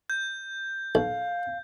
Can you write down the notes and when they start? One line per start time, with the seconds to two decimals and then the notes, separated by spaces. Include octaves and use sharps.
0.10 G6
0.95 B1 F5